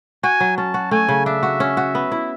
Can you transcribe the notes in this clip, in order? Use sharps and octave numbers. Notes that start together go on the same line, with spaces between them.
F#4 G#5
F#3
C#4 A5
F#4
A3 G#5
C#3
D4 E5
F#4
C#4
F#4
B3
E4